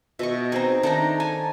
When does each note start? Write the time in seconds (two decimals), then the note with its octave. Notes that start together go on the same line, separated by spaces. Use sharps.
0.19 B2 D#5 E5 C#6
0.52 C4 D#4 G#4 A#5
0.83 D#3 A3 D4 D#4 A5 A#5
1.20 G#5 A5